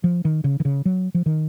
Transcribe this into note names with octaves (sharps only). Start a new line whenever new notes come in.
F3
D#3
C#3
D#3
C#3
F#3
F3
D#3